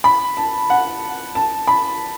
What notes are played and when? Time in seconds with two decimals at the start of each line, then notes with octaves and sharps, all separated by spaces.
0.04 B5
0.37 A5
0.70 F#5
1.35 A5
1.68 B5